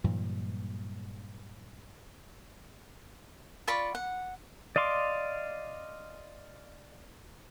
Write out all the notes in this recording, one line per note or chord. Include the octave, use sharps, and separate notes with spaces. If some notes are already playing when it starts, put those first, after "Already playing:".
G2 A#2 E3 F#3
F4 D5 B5 C#6
F#5
D5 D#5 F5 C6 D6